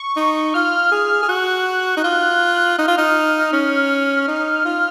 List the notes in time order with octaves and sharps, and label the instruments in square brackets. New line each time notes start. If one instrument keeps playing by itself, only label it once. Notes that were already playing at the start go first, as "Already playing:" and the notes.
Already playing: [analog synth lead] C#6
[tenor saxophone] D#4
[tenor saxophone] F4 [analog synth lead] F6
[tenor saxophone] G#4
G#4
[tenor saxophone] F#4 [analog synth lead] F#6
[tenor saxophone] D#4
F4
[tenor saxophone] D#4 [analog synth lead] F6
[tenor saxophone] F4
D#4
C#4
D#4
F4